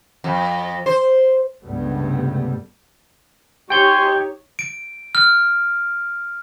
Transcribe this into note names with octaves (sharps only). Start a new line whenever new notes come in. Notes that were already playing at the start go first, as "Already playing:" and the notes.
F2
C5
C#2 G2 C3 G3 A3 B3
D#4 G4 C#5 G5 G#5 C6 C#6 G6
D7
F6